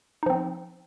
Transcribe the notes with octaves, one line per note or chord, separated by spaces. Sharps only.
F3 C4 D#4